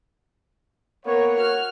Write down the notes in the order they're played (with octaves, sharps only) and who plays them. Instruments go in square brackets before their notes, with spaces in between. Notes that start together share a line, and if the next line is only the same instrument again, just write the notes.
[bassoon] A#3 [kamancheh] B3 A#4 [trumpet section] C#5
[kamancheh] F#4 F6